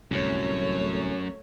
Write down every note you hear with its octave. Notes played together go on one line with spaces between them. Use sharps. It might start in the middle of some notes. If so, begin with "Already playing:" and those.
D1 C2 F#2 A3 C#5